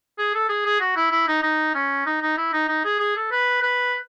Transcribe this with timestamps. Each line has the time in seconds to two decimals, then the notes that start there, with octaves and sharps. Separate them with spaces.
0.19 G#4
0.34 A4
0.49 G#4
0.66 G#4
0.80 F#4
0.97 E4
1.11 E4
1.28 D#4
1.43 D#4
1.75 C#4
2.06 D#4
2.22 D#4
2.37 E4
2.53 D#4
2.68 D#4
2.85 G#4
3.00 G#4
3.16 A4
3.32 B4
3.62 B4